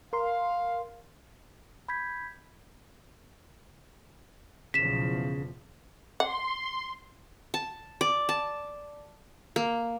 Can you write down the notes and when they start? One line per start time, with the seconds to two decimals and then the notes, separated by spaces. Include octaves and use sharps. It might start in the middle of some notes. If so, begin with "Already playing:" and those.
0.13 A#4 F5 C6
1.88 B5 G6 G#6 B6
4.74 B1 E2 C#3 F3 B6 E7
6.20 F#5 C6
7.54 A5
8.01 D5
8.29 A5
9.56 A#3